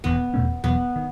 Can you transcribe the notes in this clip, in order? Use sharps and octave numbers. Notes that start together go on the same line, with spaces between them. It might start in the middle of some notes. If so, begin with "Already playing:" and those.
E1 E2 D#3 B3
E2 B2 A3 C#4
E2 B2 F#3 B3
D#3